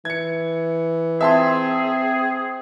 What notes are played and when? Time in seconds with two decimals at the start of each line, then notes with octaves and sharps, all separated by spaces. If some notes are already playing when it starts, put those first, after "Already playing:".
0.05 E3 G#6 C#7
1.21 C4 G#4 E5 A5 C6